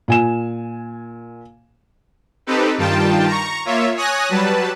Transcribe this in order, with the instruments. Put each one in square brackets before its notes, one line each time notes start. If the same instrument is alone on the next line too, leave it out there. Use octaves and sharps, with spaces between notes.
[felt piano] A#2 G#5 E7
[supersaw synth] C4 D#4 G4 A4 B4
G2 D#3 G3 F4 G5 A5
A#5 C#6
A#3 F4 C#5 E5
C#5 G#5 D#6 F#6 A#6
F#3 G3 B4 A5